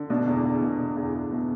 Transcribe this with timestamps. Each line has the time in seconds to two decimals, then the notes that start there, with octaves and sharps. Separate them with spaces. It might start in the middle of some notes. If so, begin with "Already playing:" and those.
Already playing: D3
0.10 B2 D4
0.27 E2
0.45 E2
0.62 B2
0.80 B2
0.96 E2
1.14 E2
1.32 B2